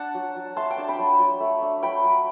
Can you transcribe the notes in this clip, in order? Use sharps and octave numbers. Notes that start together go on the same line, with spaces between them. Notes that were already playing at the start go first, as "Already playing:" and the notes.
Already playing: D4 F#5 A5
F#3
F#3
A3 A5 C6
G5
D4 A5
G5 B5
F#3
F#3
A3
D4
F#3 G5 B5
F#3